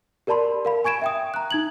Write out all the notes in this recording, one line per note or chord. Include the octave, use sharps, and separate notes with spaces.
G4 A#4 D5 A5 B5 C6
A#4 F5 B5
G#5 C#6 G#6 D7 E7
E5 G5 D#6
A#5 F#6
D#4 G#6 F#7